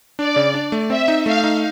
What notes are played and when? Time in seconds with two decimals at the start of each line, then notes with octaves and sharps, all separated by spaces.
0.18 D4 D5
0.36 C#3
0.54 D4
0.72 A3
0.90 C4 E5
1.08 D#4
1.26 A3 F5
1.44 D#4